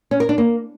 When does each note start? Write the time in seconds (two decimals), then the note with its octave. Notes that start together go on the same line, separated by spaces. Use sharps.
0.11 C#4
0.20 A#4
0.29 D4
0.38 A#3